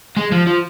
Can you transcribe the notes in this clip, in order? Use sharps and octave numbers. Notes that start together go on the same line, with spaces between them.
G#3
F3
F3